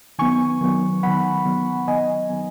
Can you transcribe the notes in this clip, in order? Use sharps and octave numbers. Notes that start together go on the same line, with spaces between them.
D#3 F#3 B3 G#5 C#6
D#3 F#3 B3
D#3 F#3 B3 F#5 B5
D#3 F#3 B3
D#3 F#3 B3 D#5 G#5
D#3 F#3 B3